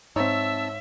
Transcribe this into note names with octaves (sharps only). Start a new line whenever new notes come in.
G#2 C4 D#4 C#5 E5 A5 E6